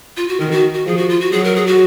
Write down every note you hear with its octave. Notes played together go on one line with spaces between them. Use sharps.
F4
F#4
D#3 A#4
F#4
F#4
F3 G#4
F#4
F4
F#4
F#3 G#4
A#4
G#4
F#4